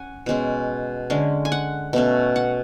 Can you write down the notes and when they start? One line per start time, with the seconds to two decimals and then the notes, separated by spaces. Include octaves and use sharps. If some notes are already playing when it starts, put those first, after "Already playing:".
Already playing: C#4 F#5 G#5
0.26 B2 G#3 C#4
1.10 D3 G#3 C#4
1.45 G#5
1.52 F#5
1.93 B2 A3 C#4
2.36 F#5